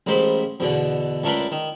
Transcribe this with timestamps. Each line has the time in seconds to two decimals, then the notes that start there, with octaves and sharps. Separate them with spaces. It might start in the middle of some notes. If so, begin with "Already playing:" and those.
0.07 A1 G#2 A#3 C5 B5
0.60 E2 B2 D3
1.24 C#2 A3 D4 A#4 B4 C6
1.52 D#3